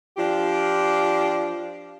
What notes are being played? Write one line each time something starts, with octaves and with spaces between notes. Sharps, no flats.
F3 D4 F4 G4